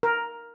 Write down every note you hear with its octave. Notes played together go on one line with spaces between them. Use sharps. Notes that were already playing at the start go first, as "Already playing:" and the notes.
A#4